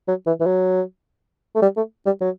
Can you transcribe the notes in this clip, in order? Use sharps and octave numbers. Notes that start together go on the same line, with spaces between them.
F#3
E3
E3
F#3
A3
G3
A3
G3
F#3